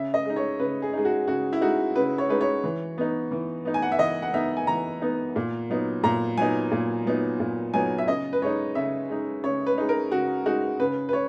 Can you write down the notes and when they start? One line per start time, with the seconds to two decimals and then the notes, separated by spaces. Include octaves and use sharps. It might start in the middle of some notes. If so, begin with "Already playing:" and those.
Already playing: C#3 E5
0.14 D#5
0.25 G#3 D#4
0.36 C#5
0.59 C#3 B4
0.82 G#4
0.93 G#3 D#4
1.05 F#4
1.27 C#3 F#4
1.53 E4
1.61 G#3 D#4 F#4
1.96 C#3 B4
2.18 C#5
2.30 G#3 D#4 B4
2.41 C#5
2.64 E3
2.98 B3 D#4
3.31 E3
3.65 B3 D#4
3.74 G#5
3.82 F#5
3.92 E5
3.99 E3 D#5
4.22 F#5
4.34 B3 D#4 E5
4.57 G#5
4.67 E3 A#5
5.02 B3 D#4
5.36 A#2
5.70 F#3 B3 D#4
6.04 A#2 A#5
6.38 F#3 B3 D#4 G#5
6.71 A#2
7.06 F#3 B3 D#4
7.40 A#2
7.74 F#3 B3 D#4 G#5
7.98 E5
8.07 C#3 D#5
8.33 B4
8.42 G#3 D#4 C#5
8.75 C#3 E5
9.09 G#3 D#4
9.43 C#3 C#5
9.67 B4
9.78 G#3 D#4
9.89 A#4
10.11 C#3 F#4
10.46 G#3 D#4 F#4
10.80 C#3 B4
11.09 B4
11.13 C#5